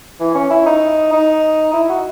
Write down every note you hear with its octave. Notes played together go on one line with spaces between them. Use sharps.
E3
C#4
E4
D#4
D#4
E4
F#4